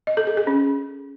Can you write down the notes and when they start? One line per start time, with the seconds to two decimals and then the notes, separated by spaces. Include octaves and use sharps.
0.07 D#5
0.17 A4
0.27 G#4
0.37 G#4
0.47 C#4